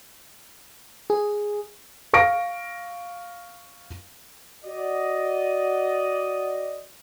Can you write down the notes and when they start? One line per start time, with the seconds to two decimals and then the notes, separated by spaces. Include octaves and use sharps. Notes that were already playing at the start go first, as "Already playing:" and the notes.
1.10 G#4
2.13 F5 C#6 A#6 D7
4.65 F#4 D5 D#5